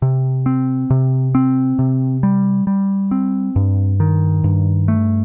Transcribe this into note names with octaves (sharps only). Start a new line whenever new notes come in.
C3
C4
C3
C4
C3
G3
G3
C4
G2
D#3
G2
A3